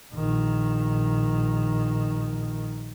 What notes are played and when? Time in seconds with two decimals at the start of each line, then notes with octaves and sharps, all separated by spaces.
0.14 A#1 D#3